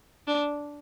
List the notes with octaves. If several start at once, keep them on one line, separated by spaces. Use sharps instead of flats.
D4